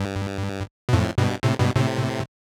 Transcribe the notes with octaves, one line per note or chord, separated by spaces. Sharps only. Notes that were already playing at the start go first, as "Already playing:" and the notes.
Already playing: G2
B2
F2 A2
G2 B2
A2 C3
G2 B2
A2 C3